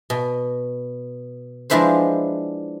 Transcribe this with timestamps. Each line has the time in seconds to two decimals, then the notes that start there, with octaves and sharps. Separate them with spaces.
0.10 B2
1.70 F3 G#3 D4 E4 B4 C5